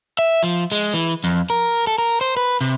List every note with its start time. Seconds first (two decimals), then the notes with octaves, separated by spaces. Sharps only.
0.19 E5
0.43 F3
0.72 G#3
0.94 E3
1.24 F2
1.50 A#4
1.87 A4
1.98 A#4
2.21 C5
2.37 B4
2.61 C3